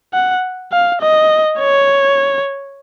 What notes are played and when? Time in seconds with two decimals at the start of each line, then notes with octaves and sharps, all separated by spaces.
0.13 F#5
0.72 F5
1.01 D#5
1.59 C#5